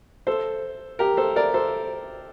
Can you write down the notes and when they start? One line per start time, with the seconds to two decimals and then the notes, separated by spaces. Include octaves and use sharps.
0.27 A4 C5
0.99 G4 A#4
1.17 A4 C5
1.36 A#4 D5
1.54 A4 C5